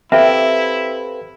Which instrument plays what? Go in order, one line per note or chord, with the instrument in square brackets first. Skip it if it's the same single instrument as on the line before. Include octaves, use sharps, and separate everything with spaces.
[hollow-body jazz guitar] C4 G4 [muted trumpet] E4 [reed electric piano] A4 B4 F5 [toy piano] E5